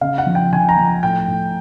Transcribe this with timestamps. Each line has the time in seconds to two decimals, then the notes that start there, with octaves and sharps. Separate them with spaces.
0.01 C#3 F5
0.18 F#5
0.26 F3
0.35 G5
0.53 F3 G#5
0.69 A#5
0.77 F3
1.03 A2 G5
1.28 A2